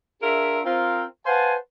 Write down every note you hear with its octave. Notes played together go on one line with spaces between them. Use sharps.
D4 F4 G#4 A#4 E5
C4 F4 A#4
B4 C5 F5 F#5 G#5 A5